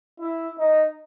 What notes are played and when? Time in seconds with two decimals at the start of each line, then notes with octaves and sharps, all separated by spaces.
0.20 E4
0.59 D#4